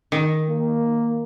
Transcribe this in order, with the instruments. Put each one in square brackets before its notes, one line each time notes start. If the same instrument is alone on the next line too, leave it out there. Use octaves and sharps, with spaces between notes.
[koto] D#3
[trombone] A#3